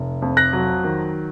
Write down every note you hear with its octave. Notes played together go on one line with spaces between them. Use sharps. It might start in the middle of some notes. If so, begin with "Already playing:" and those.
Already playing: F1
F2
F#6 A#6
F#3
D#3